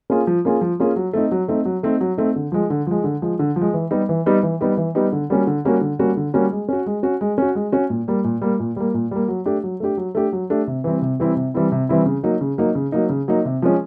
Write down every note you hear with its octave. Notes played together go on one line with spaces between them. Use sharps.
A#3 C#4 F4 G#4
F3
A#3 C#4 F4 G#4
F3
A#3 C#4 F4 G#4
F#3
A3 C4 D#4
F#3
A3 C4 D#4
F#3
A3 C4 D#4
F#3
A3 C4 D#4
D3
F3 G#3
D3
F3 G#3
D3
F3 G#3
D3
F3
G#3
E3
G3 B3 D#4 G4
E3
G3 B3 D#4 G4
E3
G3 B3 D#4 G4
E3
G3 B3 D#4 G4
D3
G3 A#3 C#4 F#4
D3
G3 A#3 C#4 F#4
D3
G3 A#3 C#4 F#4
D3
G3 A#3 C#4 F#4
G#3
C#4 F#4
G#3
C#4 F#4
G#3
C#4 F#4
G#3
C#4 F#4
A#2
G3 A#3
A#2
G3 A#3
A#2
G3 A#3
A#2
G3 A#3
F#3
A3 D4 G4
F#3
A3 D4 G4
F#3
A3 D4 G4
F#3
A3 D4 G4
C3
E3 G3 C4 E4
C3
E3 G3 C4 E4
C3
E3 G3 C4 E4
C3
E3 G3 C4 E4
C#3
F#3 A#3 D#4
C#3
F#3 A#3 D#4
C#3
F#3 A#3 D#4
C#3
F#3 A#3 D#4
C3
F3 G#3 C#4